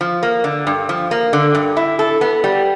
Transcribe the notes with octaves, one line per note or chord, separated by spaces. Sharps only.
F3
A#3
D3
G2
F3
A#3
D3
G2
E4
A4
B3
G3